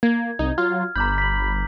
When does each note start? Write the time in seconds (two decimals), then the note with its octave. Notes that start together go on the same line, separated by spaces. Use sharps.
0.03 A#3 G#6
0.39 C2 D#4
0.58 F#3 F4 F6
0.96 G1 A#5 B5 D6 G6
1.18 B6 F#7